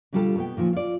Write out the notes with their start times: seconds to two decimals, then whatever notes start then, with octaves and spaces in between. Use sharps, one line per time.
0.13 B2 D3 G3 F4 G4 A4
0.36 B2 B3 G5
0.57 A#2 D#3 F3
0.73 F4 D5